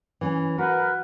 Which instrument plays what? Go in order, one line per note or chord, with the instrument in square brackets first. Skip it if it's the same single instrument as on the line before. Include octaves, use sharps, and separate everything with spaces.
[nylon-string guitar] E3 C#4
[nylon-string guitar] F#4 [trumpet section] A#4 B4